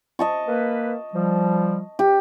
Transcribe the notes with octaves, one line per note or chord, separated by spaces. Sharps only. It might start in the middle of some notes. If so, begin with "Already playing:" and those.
D#5 A5 C#6
A#3 B4
F3 G3
G4